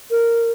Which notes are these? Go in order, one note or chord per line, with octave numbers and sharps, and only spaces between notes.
A#4